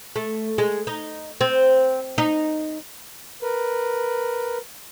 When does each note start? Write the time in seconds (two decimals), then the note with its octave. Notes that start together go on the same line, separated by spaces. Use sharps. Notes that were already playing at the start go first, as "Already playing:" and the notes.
0.16 A3
0.58 G#3
0.87 D#4
1.41 C4
2.18 D#4
3.42 A#4 B4